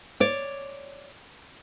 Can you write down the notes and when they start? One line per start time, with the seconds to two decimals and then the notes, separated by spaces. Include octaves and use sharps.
0.20 C#5 D5